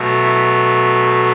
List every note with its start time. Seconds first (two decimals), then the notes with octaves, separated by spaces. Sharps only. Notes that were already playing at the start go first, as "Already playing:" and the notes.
Already playing: B2 F#3 A3
0.23 E4